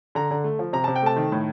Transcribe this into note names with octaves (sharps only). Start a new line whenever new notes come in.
D3 A#5
D3
A3
F3
C3 A#5
C3 A5
G5
A3 A5
D#3
A2